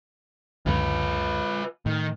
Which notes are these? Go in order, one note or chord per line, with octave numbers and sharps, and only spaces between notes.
C#2 F#2 D3 F4 B4
A2 D#3